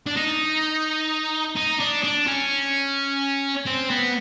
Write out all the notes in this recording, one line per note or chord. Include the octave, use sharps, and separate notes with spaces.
D4
D#4
D#4
D4
D4
C#4
C4
B3